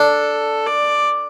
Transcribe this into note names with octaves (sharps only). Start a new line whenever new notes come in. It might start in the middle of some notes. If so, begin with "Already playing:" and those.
Already playing: D4 A4
D5